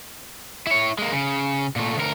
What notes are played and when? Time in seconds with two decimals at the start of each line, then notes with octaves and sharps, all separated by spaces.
0.67 E4 C#5
0.98 G#3 A#3
1.12 C#3
1.76 A#2 A3
1.97 D2 A#4